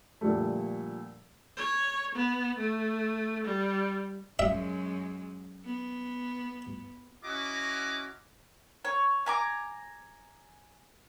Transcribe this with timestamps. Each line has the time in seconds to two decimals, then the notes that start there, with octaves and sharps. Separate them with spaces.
0.21 A#2 D3 F3 G3 A3
1.57 C#5
2.15 B3
2.58 A3
3.44 G3
4.39 F#2 F#3 G#3 E5
5.65 B3
7.24 C#4 E4 F#4 D#5 A#5 D6
8.85 C#5
9.26 G#5 A#5 D6